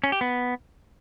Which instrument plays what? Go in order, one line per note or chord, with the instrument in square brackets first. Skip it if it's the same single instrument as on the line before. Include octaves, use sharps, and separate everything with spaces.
[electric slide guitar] C#4
G4
B3